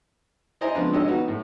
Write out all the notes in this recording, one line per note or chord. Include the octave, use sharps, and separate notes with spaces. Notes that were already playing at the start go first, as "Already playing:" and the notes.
E4 C5 D5 D#5 G#5 A#5
C#3 F3 G#3 B3 C4 D4
G#1 D3 C#5 D#5 E6
B3 D#4 F#4
A2